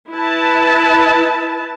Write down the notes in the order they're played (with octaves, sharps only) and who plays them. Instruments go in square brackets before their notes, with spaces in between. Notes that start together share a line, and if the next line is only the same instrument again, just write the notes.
[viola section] E4 B4 A5